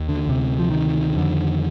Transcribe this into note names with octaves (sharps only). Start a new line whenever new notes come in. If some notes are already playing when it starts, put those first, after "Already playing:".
Already playing: D#2
D3
D2 C3
F3
D#3
F2 D3